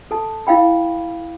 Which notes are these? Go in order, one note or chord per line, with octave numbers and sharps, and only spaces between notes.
A4 A5
E4 F5 G5 B5